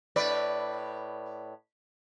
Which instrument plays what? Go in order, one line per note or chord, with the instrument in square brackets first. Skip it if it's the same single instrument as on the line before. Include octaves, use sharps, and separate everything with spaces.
[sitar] A2 B4 D5